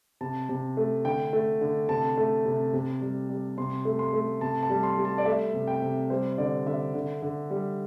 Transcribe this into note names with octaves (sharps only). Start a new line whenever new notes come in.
C3 A5
C3
A3
D3 G5
A3
D3
C3 A5
A3
C3
C3
G3
G3
C3 C6
A3
C6
A3
C3 A5
A5
G3
C6
G3
A5
D5
A3 E5
C3
G5
C3
G3 C5
D3 D5
D3 E5
D3
D3
G3